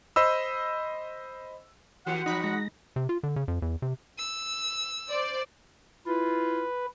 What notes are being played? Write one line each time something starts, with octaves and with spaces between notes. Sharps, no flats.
C5 D#5 B5 E6
D#3 A#3 F#4 G4 F#5
G#2 E3 F#3 D#4 B5
G#3 A#6
C3
F4
D3
C#3
F2
E2
C3
E6
C5 D5
E4 F4 B4